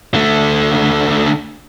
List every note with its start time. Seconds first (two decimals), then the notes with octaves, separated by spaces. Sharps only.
0.14 D3 A3